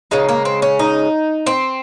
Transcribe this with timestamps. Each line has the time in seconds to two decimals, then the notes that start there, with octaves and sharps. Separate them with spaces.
0.11 C#3 G#3 D#4
0.29 A#3
0.45 C4
0.62 C#4
0.79 D#4
1.47 C4